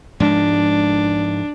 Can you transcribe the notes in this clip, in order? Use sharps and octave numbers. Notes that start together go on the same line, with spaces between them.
G#2 F3 G#3 D4